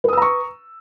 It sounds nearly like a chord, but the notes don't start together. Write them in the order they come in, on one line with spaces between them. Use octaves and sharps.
B4 D#6 E6 A#5 C#6